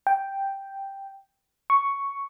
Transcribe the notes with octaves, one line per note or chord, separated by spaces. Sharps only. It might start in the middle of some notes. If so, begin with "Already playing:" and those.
G5
C#6